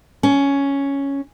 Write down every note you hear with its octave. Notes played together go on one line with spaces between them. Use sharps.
C#4